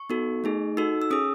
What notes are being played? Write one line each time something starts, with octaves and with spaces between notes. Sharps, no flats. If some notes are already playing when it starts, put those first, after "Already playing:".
Already playing: C#6
B3 D#4 F#4 A4
A3 D#4 G#4
D#4 F#4 A4 E6
E6
C#4 G#4 D#6